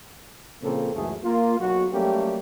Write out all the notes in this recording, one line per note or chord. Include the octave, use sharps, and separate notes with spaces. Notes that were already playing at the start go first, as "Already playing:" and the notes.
A#2 C#3 F3 A#3 C4 A4
C#2 F#2 E3 A3 G#4
A#3 F4
B1 F#4
F#3 G3 A3 A#3 C#4 G4